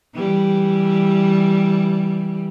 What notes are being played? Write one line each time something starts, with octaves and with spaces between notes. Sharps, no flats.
E3 G3